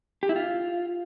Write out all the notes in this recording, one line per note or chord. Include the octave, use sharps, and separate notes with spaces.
G4
E4
F4